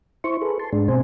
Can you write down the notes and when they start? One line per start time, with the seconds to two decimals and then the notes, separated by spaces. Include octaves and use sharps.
0.24 E4 C5 C#6
0.41 G#4 A4 B4
0.60 A5 C6
0.73 G#2 G#3 D4
0.88 B2 C4 C5 G#5